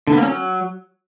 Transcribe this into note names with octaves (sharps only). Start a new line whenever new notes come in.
D3
B3
A#3
C#4
F#3